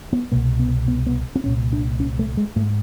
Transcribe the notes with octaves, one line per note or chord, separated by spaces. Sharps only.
B3
C2 B2 A#3
B3
B3
B3
C4
C2 A#2 C#4
D4
C#4
A3
G#3
G#2 A3